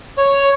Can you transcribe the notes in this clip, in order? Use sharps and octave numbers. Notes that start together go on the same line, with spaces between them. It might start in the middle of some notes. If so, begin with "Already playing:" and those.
C#5